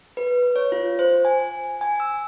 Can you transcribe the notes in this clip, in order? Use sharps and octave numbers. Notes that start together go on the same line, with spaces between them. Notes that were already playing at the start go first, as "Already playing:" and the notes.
B4
C#5
F4
C5
G#5
G#5
E6